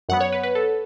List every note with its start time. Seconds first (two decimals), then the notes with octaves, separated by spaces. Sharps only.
0.09 F#2 F#3 B3 F#5
0.21 C#5
0.32 B4
0.43 B4
0.55 A4